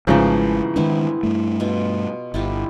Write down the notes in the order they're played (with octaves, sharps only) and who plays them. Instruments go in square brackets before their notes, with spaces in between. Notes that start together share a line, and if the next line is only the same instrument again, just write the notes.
[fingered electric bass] G#1 G#3 [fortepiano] G#2 C#3 F3 [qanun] E3 A3 B3
[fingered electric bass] D#3 G#3 D4 [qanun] B3 C4 E4
[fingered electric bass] G2 A3
[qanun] B2 F4
[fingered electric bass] G1 [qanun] E4 F4 G4